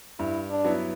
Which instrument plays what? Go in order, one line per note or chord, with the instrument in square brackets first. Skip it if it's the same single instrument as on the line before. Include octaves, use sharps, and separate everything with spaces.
[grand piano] G2 [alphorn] E4
[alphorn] D4
[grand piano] F#3 B3 E4